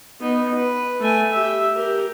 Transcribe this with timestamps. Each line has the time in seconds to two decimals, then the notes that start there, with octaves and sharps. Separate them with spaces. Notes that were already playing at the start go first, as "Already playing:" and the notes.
0.21 B3 D#4
0.55 B4
1.00 A3 G#5
1.32 G4 E5
1.75 G4 A#4